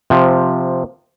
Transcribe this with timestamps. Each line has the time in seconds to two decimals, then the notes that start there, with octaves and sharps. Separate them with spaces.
0.10 C3 F3